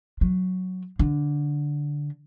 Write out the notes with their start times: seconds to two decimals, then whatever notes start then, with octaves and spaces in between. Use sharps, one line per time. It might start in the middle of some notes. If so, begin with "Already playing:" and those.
0.21 F#3
0.99 D3